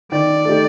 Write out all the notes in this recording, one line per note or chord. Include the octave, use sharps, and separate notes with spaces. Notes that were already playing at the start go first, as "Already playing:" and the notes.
D#3 D5
A3 D#4 G4